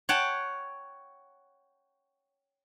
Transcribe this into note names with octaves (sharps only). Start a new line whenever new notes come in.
C#5 F#5 G5 A5